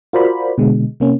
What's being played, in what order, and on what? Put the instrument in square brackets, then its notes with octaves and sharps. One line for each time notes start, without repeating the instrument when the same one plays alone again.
[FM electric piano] F4 F#4 A#4 C5 D5 B5
B2 D3 G#3
C3 A#3 C#4